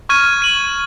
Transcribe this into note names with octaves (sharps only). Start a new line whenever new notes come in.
C#6 F6 G#6 D#7
G#6 D#7 F#7